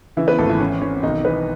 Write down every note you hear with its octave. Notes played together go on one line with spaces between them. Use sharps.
C#3 E3 E4
B3 B4
G#1 A3 A4
E3 E4
E3 C#4
E3 C#4
B1 D#3 D#4
E3 B3 B4